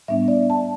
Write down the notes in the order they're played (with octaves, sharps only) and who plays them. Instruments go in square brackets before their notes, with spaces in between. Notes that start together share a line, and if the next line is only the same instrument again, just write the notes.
[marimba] A2 G3 B3 D4 E5
D5
A5